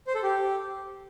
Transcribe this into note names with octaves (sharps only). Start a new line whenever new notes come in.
C5
A4
G4